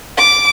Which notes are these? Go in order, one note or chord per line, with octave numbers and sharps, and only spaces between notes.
D6